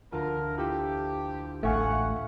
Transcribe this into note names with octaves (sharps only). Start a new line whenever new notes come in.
D2 F4 A#4 A5
E4 F4 G4 A4
A1 A3 F5 F#5 G#5 C#6 F6